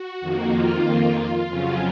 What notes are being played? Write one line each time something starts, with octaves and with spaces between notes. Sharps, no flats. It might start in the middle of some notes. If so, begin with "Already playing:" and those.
Already playing: F#4
F2 D#3 A#3
F4
F4
F2 C#3 F#3 C#4